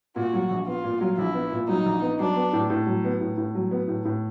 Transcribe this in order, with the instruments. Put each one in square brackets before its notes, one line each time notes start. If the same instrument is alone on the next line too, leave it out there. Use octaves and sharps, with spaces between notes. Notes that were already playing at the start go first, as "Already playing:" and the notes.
[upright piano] A#2 [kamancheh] F#4
[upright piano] F#3
A#1
[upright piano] B3 [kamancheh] F4
[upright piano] A#2
F#3
[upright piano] A#1 [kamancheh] E4
[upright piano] B3
A#2
[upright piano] F#3 [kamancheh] D#4
[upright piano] A#1
B3
[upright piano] F#3 [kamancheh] D4
[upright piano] B3
A2
A2
F#3
B3
A2
A2
F#3
B3
A2
A2